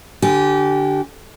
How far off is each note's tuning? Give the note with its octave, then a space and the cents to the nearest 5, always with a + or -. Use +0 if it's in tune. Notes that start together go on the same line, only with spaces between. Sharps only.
D3 +0 G4 -25 G#5 +0